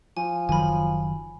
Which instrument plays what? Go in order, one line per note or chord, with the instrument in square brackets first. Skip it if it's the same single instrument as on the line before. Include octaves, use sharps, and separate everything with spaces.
[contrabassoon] F3 [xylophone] G#5
[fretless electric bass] F#1 D#3 F#3 [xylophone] G#5 B5